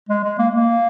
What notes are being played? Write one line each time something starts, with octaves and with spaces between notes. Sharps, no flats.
G#3
G#3
A#3
A#3